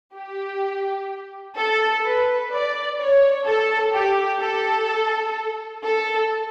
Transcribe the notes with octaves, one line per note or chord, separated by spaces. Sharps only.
G4
A4
B4
D5
C#5
A4
G4
A4
A4